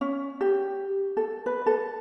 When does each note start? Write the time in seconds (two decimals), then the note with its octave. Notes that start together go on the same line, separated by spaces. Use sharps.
0.01 C#4
0.41 G4
1.17 A4
1.46 B4
1.66 A4